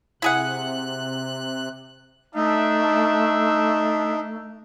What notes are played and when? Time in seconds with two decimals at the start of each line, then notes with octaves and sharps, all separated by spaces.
0.22 C3 E4 G#4 F#5 F#6
2.35 A3 D4 D#4 E5